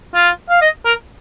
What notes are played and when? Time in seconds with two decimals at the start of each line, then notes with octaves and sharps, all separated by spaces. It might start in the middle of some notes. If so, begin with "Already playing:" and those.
0.15 F4
0.50 F5
0.61 D#5
0.85 A#4